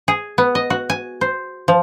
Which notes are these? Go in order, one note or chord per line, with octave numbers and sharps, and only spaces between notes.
G#4
B3
D#5
F#4
G#5
C5
F3